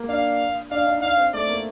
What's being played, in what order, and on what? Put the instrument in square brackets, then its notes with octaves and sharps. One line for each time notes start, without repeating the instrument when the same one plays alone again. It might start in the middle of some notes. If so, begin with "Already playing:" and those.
Already playing: [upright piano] A#3
[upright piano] D4 [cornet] F5
[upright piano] D4 [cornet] F5
[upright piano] D4
D#4
[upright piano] D4 [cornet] F5
[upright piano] C4
[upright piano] A3 [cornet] D5
[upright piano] A#3